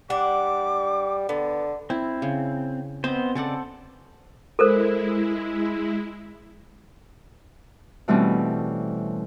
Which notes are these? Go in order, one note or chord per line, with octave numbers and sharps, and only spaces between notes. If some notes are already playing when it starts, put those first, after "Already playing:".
G3 D4 F#5 D6
D3 B3
C4 E4
C#3
B3 C4 C5 D#5
C#3 C4 A4 D5 F#5
G#3 E4 A4 A#4 C5
B2 E3 G3 A3 C4 C#4